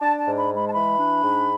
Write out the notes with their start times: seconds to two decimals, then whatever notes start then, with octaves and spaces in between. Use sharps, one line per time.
0.01 D4 A5
0.19 A5
0.26 G#2
0.38 B5
0.49 G#3
0.56 B5
0.69 A5
0.74 E3 B5
0.98 D4
1.23 G#2